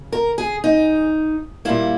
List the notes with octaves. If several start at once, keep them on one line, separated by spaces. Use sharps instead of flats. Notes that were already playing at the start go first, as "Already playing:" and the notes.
Already playing: C#3
A#4
G#4
D#4
A#2 G3 A#3 E4